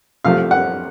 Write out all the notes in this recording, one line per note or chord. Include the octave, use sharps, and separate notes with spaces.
C2 C3 F3 A3 F5
F#5